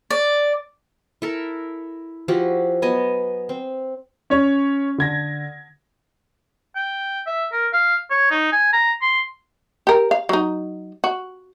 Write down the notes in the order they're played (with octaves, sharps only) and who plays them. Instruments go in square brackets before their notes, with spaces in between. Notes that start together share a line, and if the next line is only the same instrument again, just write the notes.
[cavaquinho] D5
[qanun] E4 A4 A#4
F3 E4 F#4 G4
F#3 B3 D#5 G#5
C4
[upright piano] C#4 C#5
D3 G#6 A#6
[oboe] G5
E5
A#4
F5
C#5
D#4
G#5
A#5
C6
[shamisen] G4 A#4
F5
F#3 D#4
F#4